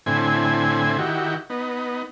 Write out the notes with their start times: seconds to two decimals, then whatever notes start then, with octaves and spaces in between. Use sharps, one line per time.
0.06 A2 D3 C4 E4 G#5
0.99 D#3 E4 F#4 G4
1.50 B3 D#4